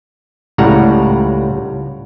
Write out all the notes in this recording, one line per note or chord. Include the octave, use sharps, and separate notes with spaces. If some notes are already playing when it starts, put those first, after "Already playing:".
C#2 A2 G3 F#5 A#5